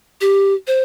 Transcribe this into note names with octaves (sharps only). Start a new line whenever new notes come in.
G4
C5